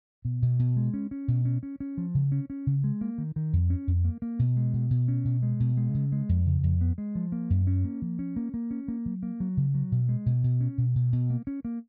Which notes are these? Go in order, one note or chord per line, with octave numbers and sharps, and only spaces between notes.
B2
B2
B2
G#3
C#4
C#4
B2
C#4
C#4
C#4
F3
C#3
C#4
C#4
C#3
G#3
A#3
D#3
D#3
F2
C#4
F2
A#3
A#3
B2
G#3
B2
B2
C#4
B2
G#3
B2
G#3
C#3
G#3
F2
C#3
F2
B3
G#3
F3
A#3
F#2
C#4
A#3
F3
C#4
A#3
A#3
C#4
A#3
F#3
A#3
F#3
C#3
F#3
B2
G#3
B2
B2
C#4
B2
B2
B2
A#3
C#4
A#3